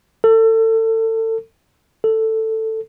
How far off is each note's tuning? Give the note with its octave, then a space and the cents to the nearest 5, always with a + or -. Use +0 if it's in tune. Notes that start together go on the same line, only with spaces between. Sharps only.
A4 +30
A4 +10